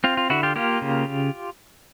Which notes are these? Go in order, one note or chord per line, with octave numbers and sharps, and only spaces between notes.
C4 F4
F4
D3 E4 F#4
F4 G4
A#3 F4 G4
C#3